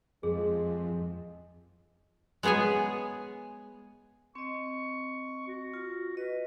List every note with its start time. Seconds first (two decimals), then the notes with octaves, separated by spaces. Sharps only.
0.23 F2 G#3 G#4
2.43 G#3 B3 G#4 C#5 G#5
4.35 C4 D#5 C#6
5.48 F#4
5.74 F4
6.17 B4 D#5